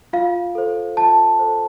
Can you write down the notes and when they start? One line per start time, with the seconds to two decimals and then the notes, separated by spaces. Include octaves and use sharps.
0.13 F4 F5
0.55 A4 C5
0.97 F4 A5
1.39 A4 C5